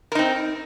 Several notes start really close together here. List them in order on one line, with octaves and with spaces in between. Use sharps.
A#4 D#4 C4